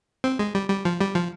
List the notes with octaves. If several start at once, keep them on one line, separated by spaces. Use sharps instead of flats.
C4
G#3
G3
G3
F3
G3
F3